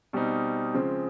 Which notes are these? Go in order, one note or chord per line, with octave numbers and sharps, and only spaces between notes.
B2 G3 C4 D#4
C#3 F3 G#3 C4